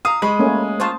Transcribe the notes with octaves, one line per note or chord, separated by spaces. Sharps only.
F5 A#5 D#6
G#3 B5 C#6
A3 A#3 C#4
F4 C5 A5 C#6 D#6